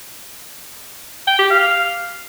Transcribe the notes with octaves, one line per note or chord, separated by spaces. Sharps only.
G5
G4
F5